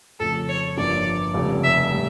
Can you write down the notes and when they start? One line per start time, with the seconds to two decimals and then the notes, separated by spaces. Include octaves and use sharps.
0.20 F2 C#3 F3 A3 C#4 A4
0.48 C#5
0.77 G1 G2 F3 A#3 C#4 D5
1.34 F1 F2 C#3 G3
1.63 E5
1.92 A2 G3